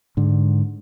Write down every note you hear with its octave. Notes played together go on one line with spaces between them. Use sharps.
G#2 D3